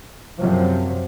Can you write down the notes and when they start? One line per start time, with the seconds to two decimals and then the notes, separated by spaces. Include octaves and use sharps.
0.39 F#2 C3 F3 F#3